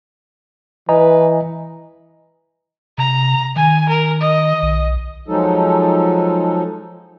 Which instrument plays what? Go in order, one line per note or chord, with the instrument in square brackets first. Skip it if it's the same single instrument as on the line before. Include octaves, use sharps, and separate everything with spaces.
[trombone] E3 [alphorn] B4 [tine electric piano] D#5 G#5 A#5
[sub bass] C3 [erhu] A#5
[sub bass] D#3 [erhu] G#5
[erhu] A#4
D#5
[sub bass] B1
[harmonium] F3 F#3 G#3 D#4 A4